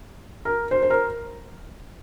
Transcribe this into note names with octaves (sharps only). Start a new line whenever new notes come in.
A#4
C5
C5
A#4